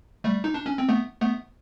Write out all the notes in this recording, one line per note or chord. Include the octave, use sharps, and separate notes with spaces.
G3 A3
D#4
D4
C#4
C4
A3 B3
A3 B3